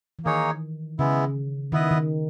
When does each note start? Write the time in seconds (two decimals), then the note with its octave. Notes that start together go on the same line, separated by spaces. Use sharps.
0.19 E3
0.25 D#3 A#3 D#4 G#4 C#5
0.99 C#3 G#3 B3 E4
1.72 D#3 B3 E4 B4 D#5
1.91 D#3